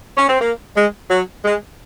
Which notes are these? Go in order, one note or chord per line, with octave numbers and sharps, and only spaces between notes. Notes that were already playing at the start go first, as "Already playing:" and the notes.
C#4
C4
A#3
G#3
F#3
G#3